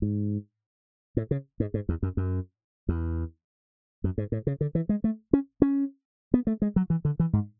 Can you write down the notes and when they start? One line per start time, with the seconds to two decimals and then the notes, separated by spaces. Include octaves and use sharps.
0.02 G#2
1.17 A2
1.31 C#3
1.60 G#2
1.74 G#2
1.89 E2
2.03 F#2
2.17 F#2
2.89 E2
4.04 F#2
4.18 G#2
4.32 A2
4.47 C#3
4.61 D3
4.75 E3
4.89 G#3
5.04 A3
5.33 C#4
5.62 C#4
6.34 B3
6.47 A3
6.62 G#3
6.76 F#3
6.90 E3
7.05 D3
7.20 E3
7.33 G#2